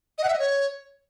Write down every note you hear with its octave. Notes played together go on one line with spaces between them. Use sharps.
D#5
F#5
E5
D#5
C#5